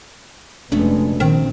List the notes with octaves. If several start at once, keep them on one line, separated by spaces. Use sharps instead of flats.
F1 G2 B2 G#3 A3 C#4 D4
A#1 D#3 C4